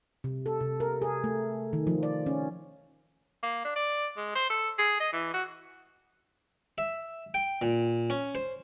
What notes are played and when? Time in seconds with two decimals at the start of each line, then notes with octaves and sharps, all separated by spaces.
0.24 C3
0.46 A4
0.60 C3
0.80 A#4
1.02 G#4
1.24 A3
1.73 D#3
1.87 F3
2.03 D5
2.26 C#4
3.43 A#3
3.64 D4
3.76 D5
4.17 G#3
4.35 C5
4.50 A4
4.78 G#4
5.00 D#5
5.13 E3
5.33 F#4
6.78 E5
7.34 G5
7.62 A#2
8.10 C#4
8.35 C5